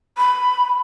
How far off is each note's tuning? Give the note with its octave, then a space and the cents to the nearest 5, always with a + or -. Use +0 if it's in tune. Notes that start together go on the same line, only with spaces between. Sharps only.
B5 +10